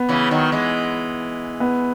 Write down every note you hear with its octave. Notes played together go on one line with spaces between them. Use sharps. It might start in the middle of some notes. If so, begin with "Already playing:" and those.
Already playing: B3
C#3 E3
D#3 F#3
E3 G#3
B3